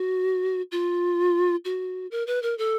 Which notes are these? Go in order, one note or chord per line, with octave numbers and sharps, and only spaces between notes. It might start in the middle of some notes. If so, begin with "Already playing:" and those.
Already playing: F#4
F4
F#4
A#4
B4
A#4
A4